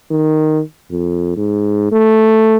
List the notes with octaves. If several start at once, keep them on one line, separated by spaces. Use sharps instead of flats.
D#3
F2
G#2
A3